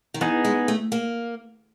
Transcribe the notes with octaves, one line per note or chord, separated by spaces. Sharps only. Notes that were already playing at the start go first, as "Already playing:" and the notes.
D#3
E3 B3 D#4 G#4
G#3
A3
A#3